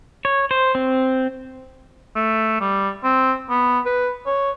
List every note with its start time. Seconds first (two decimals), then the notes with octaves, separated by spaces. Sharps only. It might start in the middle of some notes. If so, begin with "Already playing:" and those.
0.25 C#5
0.51 C5
0.75 C4
2.16 A3
2.61 G3
3.04 C4
3.50 B3
3.85 B4
4.26 C#5